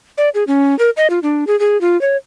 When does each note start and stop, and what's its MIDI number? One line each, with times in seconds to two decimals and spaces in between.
0.18 0.29 74
0.35 0.44 68
0.47 0.77 61
0.79 0.90 70
0.97 1.07 75
1.10 1.19 65
1.23 1.45 62
1.47 1.58 68
1.60 1.80 68
1.81 1.99 65
2.01 2.16 73